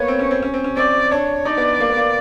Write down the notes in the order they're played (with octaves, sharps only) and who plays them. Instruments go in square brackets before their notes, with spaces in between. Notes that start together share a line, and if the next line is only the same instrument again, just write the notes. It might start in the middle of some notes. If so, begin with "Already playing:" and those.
Already playing: [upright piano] A#3 B3 [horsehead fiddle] C#5
[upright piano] C4
C#4
C4
C#4
C4
C#4
[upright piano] C4 [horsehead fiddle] D5
[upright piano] D4 [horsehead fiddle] C#5
[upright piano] D#4 [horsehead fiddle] D5
[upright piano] B3
A#3
B3
A#3